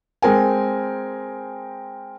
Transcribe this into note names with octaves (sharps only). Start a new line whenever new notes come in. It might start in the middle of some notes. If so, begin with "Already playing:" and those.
G#3 C4 A#4 G5 G#5